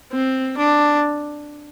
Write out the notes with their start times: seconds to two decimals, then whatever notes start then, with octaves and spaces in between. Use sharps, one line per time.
0.12 C4
0.57 D4